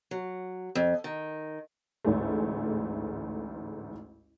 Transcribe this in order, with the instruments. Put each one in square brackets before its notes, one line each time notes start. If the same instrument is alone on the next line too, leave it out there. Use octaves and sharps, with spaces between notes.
[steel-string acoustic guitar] F#3
F2
D#3
[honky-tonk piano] A1 D2 G#2 G#3 A3